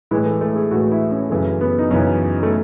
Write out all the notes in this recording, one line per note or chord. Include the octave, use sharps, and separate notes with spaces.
A2 E3 G#3
A3
A3
G#4
A2 E3 F#4
E4
C#4
F#2 C#3 E3 A3
B3
D#4
F#2 C#3 E3 C#4
A3